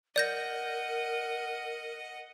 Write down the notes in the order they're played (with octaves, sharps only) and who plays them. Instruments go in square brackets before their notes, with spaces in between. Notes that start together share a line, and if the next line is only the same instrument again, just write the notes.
[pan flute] A#4 [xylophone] D5 G6 A#6 [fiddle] D#5 F#5